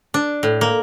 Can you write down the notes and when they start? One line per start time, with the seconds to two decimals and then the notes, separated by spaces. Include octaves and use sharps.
0.14 D4
0.43 A2
0.61 A#3